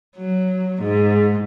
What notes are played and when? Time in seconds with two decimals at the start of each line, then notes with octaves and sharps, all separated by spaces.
0.17 F#3
0.82 G#2